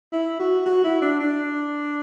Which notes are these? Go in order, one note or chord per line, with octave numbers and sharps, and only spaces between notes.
E4
F#4
F#4
E4
D4
D4